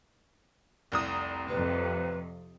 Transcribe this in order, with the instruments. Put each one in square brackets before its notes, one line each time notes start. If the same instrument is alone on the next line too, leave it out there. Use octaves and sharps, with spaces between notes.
[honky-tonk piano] F1 C2 D#6
[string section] F2 C3 [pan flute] B4